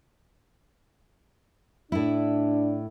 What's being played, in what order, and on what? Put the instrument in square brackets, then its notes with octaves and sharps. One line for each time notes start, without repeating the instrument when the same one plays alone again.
[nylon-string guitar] A2 E4 [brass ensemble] D4